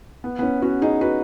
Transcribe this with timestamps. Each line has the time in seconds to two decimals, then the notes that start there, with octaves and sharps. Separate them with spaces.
0.24 B3
0.39 B3
0.43 C#4
0.62 C#4 F#4
0.82 D#4 G#4
1.01 F#4 B4